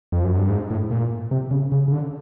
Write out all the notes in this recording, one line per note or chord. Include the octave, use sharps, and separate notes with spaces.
F2
F#2
G2
G#2
A2
A#2
C3
C#3
C#3
C#3
D3